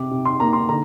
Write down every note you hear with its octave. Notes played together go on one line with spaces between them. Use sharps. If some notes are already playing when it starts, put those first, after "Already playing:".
Already playing: C3 D6
C3
C6
A#3 A#5
C6
D3 A#5